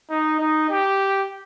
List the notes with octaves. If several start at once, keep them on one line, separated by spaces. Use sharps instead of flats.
D#4
D#4
G4